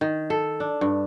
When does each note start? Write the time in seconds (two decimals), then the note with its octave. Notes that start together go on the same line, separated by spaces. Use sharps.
0.01 D#3
0.30 A4
0.60 D4
0.81 G2